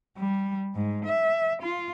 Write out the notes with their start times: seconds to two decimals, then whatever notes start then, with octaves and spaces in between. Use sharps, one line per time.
0.17 G3
0.75 G#2
1.05 E5
1.62 F4